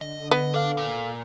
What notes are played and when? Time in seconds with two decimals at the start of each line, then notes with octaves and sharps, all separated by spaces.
0.01 D3 D#5
0.31 B3 D#5
0.54 D4 A4 F5
0.77 A#2